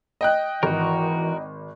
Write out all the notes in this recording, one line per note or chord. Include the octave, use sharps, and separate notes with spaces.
D#5 G5 F#6
G#1 E3 F#4 A#4